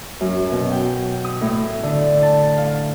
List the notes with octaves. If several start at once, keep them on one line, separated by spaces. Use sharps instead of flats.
F#2
B2
G5
D#6
A2
D3
A5
F5